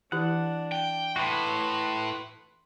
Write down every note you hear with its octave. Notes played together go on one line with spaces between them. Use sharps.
E3 D4 E4 G4 F#5
G5
A2 F#4 B4 G5 B5 C6